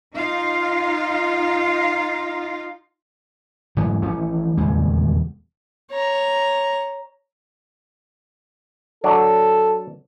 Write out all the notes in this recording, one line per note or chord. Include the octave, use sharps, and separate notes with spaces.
D#4 F4 F5
G#2 E3 F#3 G#3
E3 F3 A3 C#4
D#1 E2 C#3 G#3
C#5 A#5
F#3 D4 A4